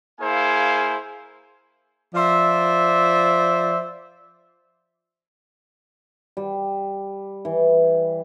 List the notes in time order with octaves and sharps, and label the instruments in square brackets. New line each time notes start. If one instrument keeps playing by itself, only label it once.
[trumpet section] A#3 E4 G#4 C5 F5 G#5
[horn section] F3 C5 D5 E5
[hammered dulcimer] G3
E3